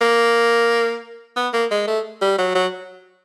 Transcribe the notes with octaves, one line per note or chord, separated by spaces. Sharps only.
A#3
B3
A#3
G#3
A3
G3
F#3
F#3